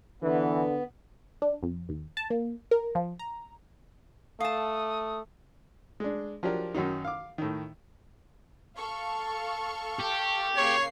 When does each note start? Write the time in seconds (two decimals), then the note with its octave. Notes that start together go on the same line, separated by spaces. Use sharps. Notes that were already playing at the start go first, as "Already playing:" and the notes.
0.22 D3 E3 B3
1.42 D4
1.63 F2
1.89 D#2
2.17 A5
2.30 A#3
2.71 A#4
2.95 F3
3.19 A#5
4.40 A3 F5 A5 D#6
6.00 G#3 D4
6.43 F3 F#3 D4 G4 A#4
6.75 F#2 D#3 F#3 D#4
7.05 F5 D6
7.38 A2 D#3
8.77 A4 F5 C#6
10.00 G4
10.57 C#3 A#3 C#5 C7